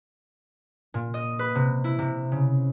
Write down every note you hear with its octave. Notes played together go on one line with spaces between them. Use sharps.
A#2
D#5
B4
C3
E4
C3
C#3